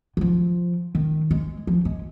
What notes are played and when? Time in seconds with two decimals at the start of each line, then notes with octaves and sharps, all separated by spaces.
0.17 D#3
0.21 F3
0.95 D#3
1.31 G#3
1.67 F3
1.85 G#3